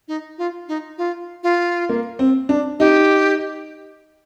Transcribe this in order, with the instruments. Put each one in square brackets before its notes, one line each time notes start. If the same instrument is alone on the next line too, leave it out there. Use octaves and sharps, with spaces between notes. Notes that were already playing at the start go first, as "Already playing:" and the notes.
[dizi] D#4
F4
D#4
F4
F4
[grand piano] A#3
C4
D4
[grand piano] D#4 [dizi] G4